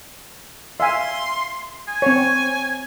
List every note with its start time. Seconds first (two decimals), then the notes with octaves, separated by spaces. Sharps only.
0.80 E5 F5 G#5 C6
1.88 G#5
2.02 C4 C#5